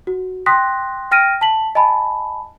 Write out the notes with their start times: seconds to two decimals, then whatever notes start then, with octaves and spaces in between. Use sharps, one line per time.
0.07 F#4
0.46 G5 C6 D#6 F#6 A#6 B6
1.11 G5 F6 A#6 D7 D#7
1.41 A5 B6 F#7
1.75 D#5 G#5 A5 B5